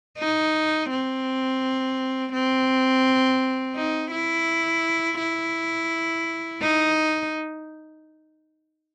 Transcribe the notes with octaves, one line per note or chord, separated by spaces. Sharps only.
D#4
C4
C4
D#4
E4
E4
D#4